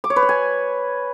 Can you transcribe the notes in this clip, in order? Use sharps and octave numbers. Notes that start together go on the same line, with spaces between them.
D6
C#5
B4
C#5
G#5